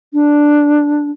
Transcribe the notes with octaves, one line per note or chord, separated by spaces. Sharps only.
D4